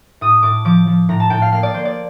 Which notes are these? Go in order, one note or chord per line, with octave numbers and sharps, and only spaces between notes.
A2 D#6
A2 D6
F3 D6
F3
A2 A#5
A5
A2 G5
F5
A#3 F5
D5
A#3 C5
D5